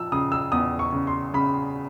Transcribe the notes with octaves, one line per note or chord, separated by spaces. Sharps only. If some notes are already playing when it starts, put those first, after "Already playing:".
Already playing: F3 E6
C#3 D#6
E6
E2 D#6
C#6
C#3
C6
C#3 B5